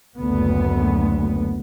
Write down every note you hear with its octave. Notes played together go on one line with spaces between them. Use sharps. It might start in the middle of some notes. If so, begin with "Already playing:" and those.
F#1 D2 B3